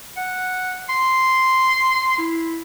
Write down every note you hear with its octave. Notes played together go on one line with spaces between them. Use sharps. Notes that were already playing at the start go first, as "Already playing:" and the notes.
F#5
C6
E4